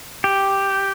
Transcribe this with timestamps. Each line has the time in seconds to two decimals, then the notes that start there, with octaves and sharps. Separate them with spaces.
0.24 G4